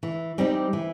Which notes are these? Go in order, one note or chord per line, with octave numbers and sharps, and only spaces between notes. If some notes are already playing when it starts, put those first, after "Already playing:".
E3
G3 C4 D#4 G4
E3